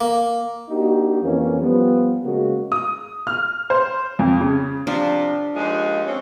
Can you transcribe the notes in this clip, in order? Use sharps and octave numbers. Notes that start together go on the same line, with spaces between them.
A#3
A#3 D4 D#4 F#4 G4
F2 E3 F3 A#3 C#4
F3 G3 B3
C#3 G#3 A#3 F#4
D#6
F6
C5
F2
C#3
C3 F3 D4
D#2 F3 G#3
C4 C#4